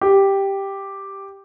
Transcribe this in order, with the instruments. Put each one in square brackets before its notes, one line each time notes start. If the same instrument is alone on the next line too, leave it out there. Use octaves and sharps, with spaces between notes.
[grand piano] G4